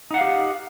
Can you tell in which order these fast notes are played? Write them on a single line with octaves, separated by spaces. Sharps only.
D#4 F#5 F5 G4